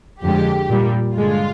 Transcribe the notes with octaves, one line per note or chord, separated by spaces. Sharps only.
F2 D3 G#3 G4
A#2 G3
G2 D3 G#3 F4